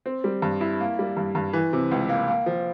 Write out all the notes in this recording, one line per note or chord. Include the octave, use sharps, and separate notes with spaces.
C4
G3
G2
E4
A#3
G3
G2
G2
E3
C3
C#2
A#3
A#3
F3